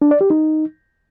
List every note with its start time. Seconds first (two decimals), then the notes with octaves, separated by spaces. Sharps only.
0.02 D4
0.11 D5
0.21 G4
0.30 D#4